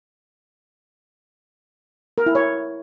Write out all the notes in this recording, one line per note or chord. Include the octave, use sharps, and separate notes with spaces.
A#4
E4
C#5